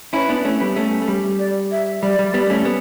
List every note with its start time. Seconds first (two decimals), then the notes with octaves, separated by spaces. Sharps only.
0.13 C#4 E4 B4 C#5
0.29 B3 D4
0.45 A3 C#4
0.60 G3 B3
0.76 A3 C#4
1.02 A3
1.08 G3
1.39 D5
1.72 E5
2.02 G3 D5
2.19 G3
2.34 G3 B3
2.46 B3
2.50 A3 C#4
2.65 B3